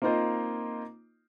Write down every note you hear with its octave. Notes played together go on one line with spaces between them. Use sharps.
A#3 C4 D#4 F4 C5 D#5